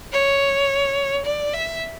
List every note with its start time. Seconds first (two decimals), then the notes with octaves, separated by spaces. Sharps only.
0.13 C#5
1.26 D5
1.54 E5